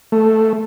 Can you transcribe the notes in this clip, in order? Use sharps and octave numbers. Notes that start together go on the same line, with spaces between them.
A3